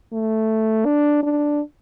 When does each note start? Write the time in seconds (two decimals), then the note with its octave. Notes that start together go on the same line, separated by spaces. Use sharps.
0.13 A3
0.85 D4
1.23 D4